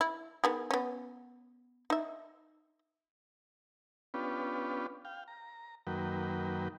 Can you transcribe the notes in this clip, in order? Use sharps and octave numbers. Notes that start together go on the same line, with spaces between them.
E4
D#3 B3 G#4
B3 C#4
D#4 E5
B3 C#4 D4 F4 G4 B4
F5 G5
A#5
F#2 D#3 F#3 A#3 B4 G5